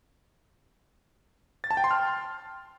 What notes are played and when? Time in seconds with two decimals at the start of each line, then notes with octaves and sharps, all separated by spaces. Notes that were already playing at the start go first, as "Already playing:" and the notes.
1.64 A6
1.71 A5
1.77 G5
1.84 C6
1.91 F6